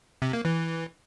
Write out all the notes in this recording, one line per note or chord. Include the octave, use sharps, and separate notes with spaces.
C3
A#3
E3